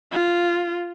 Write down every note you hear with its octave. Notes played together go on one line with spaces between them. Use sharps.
F4